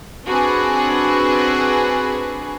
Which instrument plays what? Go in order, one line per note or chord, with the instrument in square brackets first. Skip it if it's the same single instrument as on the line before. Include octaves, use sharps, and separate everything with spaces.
[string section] C4 D4 F#4 G#4 B4